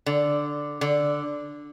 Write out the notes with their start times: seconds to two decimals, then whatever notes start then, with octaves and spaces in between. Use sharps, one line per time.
0.06 D3
0.81 D3